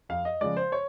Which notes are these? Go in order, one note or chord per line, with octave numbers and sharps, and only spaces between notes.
F2 F5
D#5
C#3 F3 G#3 D5
C5
C#5